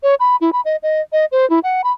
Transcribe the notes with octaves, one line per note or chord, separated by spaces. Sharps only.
C#5
B5
E4
B5
D#5
D#5
D#5
C5
E4
F#5
B5